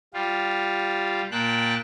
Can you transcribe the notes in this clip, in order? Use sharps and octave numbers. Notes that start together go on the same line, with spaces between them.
G3 F4
A#2 G5 A5 F#6